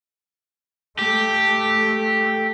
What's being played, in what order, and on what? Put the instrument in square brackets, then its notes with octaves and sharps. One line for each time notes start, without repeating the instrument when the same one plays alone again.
[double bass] A3 [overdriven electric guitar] G4